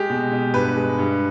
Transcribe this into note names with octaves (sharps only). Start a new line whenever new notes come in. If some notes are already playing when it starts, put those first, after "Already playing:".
Already playing: G#3 G4
B2
B2
G2 B4
G#3
G2